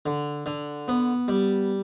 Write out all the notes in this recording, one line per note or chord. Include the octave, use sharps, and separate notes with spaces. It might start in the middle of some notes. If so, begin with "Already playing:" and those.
D3
D3
B3
G3